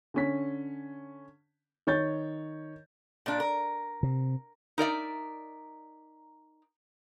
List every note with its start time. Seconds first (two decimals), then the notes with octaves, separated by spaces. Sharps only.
0.14 D3 C#4 B6
1.87 D#3 C#5 G6 A6
3.26 A#2 D4
3.40 A#4
4.03 C3
4.78 D#4 A#4 D5 E5